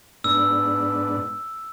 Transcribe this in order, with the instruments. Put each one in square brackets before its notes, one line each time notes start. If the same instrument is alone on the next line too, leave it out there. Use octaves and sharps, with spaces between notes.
[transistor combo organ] G#2 B3 D4 [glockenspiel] E6